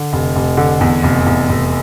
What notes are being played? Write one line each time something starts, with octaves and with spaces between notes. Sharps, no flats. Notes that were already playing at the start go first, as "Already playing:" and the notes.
Already playing: D3
F1
F1
D3
E2
F1
E2
F1